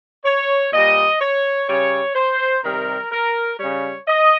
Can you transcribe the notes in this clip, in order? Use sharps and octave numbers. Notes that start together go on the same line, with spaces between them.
C#5
A#2 G3 D#5
C#5
C#3 G3 C#5
C5
C3 D#3 G3 A#4
A#4
C#3 G3 C#5
D#5